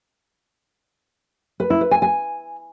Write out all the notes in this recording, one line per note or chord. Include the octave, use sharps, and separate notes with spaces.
B4
E4
B4
G#5
G#5